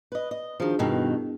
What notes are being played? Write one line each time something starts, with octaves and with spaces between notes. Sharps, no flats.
B4 D#5
D#5
D#3 F3 D4 F#4 G#4
G2 B2 D#3 B3 E4 G5